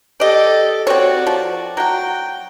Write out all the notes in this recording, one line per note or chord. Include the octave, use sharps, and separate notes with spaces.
G4 A4 D5 D#5
C4 F#4 C#5 D5
F3
F#3 F#4 G5